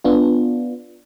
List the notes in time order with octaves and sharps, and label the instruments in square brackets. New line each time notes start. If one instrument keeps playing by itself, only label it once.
[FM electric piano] B3 D4 F4